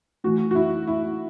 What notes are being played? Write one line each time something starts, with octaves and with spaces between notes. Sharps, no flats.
A2 E3 F#4
F#4
E4
E4